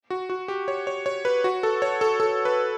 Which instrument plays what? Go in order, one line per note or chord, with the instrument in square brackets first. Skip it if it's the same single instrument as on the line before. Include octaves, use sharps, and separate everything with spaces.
[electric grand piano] F#4
F#4
G4
C#5
C#5
C#5
B4
F#4
A4
C#5
A4
A4
B4